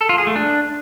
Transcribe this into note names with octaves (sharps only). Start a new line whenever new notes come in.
A4
F4
G#4
A3
D4